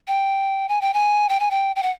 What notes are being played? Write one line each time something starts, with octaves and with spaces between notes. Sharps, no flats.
G5
G#5
G5
G#5
G5
G#5
G5
G5
F#5